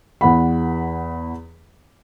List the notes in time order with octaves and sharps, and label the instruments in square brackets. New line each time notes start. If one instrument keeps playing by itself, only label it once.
[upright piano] E2 F#5 B5